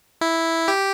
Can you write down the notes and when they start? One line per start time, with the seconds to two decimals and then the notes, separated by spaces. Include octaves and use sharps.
0.21 E4
0.68 G4